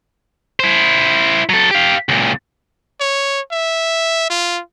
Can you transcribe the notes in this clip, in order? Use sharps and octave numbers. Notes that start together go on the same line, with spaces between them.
E4 C5
F#3 A4
G4 F5
C#2 A#2
C#5
E5
F4